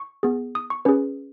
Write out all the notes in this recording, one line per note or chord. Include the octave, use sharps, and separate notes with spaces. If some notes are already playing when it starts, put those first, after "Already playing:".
Already playing: C#6
B3 G#4
D#6
C#6
C#4 G#4 B4